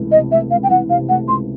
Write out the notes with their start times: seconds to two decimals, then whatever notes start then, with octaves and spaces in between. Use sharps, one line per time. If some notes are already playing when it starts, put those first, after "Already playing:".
Already playing: C#2 C3 E3 A3
0.12 C3 D#5
0.31 A3 E5
0.51 C#2 F5
0.63 G5
0.70 E3 F#5
0.89 C3 F5
1.08 A3 F#5
1.28 C#2 C6